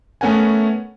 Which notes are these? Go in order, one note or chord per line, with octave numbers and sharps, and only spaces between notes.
A3 B3 C#4 A#4 F#5 G#5